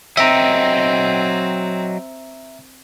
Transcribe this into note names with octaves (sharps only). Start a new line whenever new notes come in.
F#3 C4 D#5 E5 G5 A#5